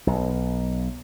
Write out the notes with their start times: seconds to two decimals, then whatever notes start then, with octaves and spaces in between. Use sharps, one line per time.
0.07 B1